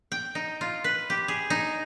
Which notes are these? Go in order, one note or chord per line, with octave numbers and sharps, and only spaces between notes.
G5
D#4
F4
B4
G4
G#4
D#4